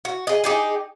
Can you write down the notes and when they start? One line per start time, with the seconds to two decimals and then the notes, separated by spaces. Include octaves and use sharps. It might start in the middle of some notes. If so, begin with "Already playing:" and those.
0.05 F#4
0.27 G#4 D#5
0.44 D#4 G4 G#4